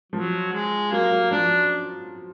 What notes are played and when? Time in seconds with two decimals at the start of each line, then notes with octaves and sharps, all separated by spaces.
0.12 F3 F#3
0.53 G#3
0.92 F#3 A#3
1.12 F#3
1.31 F3 D4